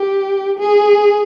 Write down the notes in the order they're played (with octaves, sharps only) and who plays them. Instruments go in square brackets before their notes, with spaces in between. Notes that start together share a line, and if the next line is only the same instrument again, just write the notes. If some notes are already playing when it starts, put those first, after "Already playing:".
Already playing: [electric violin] G4
G#4